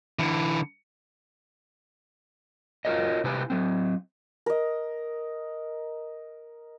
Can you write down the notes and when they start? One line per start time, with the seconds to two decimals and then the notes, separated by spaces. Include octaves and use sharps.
0.19 D3 E3
2.85 F4 F#4 G#4 A#4 C#5 D#5
3.24 C3 E4 G4 B4 G#5
3.50 F#3 C4
4.46 A#4 D#5